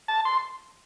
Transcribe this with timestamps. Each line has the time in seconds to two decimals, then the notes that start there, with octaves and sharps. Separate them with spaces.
0.08 A5
0.25 C6